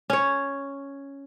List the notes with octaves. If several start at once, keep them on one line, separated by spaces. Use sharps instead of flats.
C#4 C#5